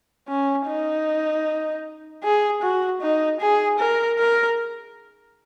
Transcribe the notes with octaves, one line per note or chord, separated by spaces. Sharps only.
C#4
D#4
G#4
F#4
D#4
G#4
A#4
A#4